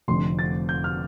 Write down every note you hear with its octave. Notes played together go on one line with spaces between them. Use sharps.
F1 F2 D3 A3 C4 C6
A6
G6
F6